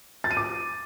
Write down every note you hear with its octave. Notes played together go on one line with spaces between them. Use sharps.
A6
D#7
D6